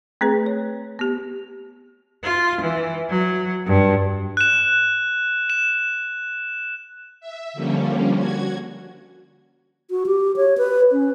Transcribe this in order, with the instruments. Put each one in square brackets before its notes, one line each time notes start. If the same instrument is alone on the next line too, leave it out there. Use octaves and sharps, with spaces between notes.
[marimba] A3 C4 G#4 B4
C#5
B3 G4
[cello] F4
E3
F#3
G2
[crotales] F#6 E7
E7
[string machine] E5
D3 F3 G3 A#3 C#4
F#4 G#6
[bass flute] F#4
G4
C#5
B4
C#4